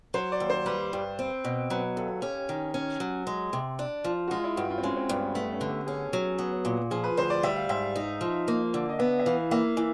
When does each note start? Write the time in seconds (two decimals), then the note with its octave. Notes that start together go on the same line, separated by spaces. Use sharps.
0.14 F#3 C5
0.32 D5
0.40 D#2
0.50 C5
0.66 G3 B4
0.93 G2
1.19 C4
1.45 B2
1.70 F#3 B4
1.96 D#2 A4
2.22 C#4 G4
2.49 D#3
2.74 C#4
3.00 F#3
3.27 G#3
3.53 C3
3.79 D4
4.04 F3
4.27 F#4
4.31 G#3 F4
4.44 E4
4.56 G2 F#4
4.70 F4
4.78 C4
4.83 G#3 C#4
4.97 C4
5.09 G2 B3
5.35 A3 B3
5.52 C#4
5.61 D3
5.69 G4
5.86 C#4 G#4
6.13 F#3
6.39 B3
6.65 A#2
6.91 F3 G#4
7.04 B4
7.17 D2 C5
7.30 D5
7.43 G3 E5
7.56 F5
7.69 G#2 E5
7.82 F5
7.96 D#4
8.21 F3
8.48 A#3
8.74 D3
8.89 D#5
8.99 B3 E5
9.19 E5
9.26 E3 F5
9.51 A#3 E5
9.77 E3